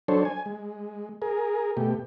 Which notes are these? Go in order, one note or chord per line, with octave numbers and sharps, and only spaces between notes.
F#3 D4 A4 C5 C#5
G#5
G#3
G#4 A#4
B2 A3 G4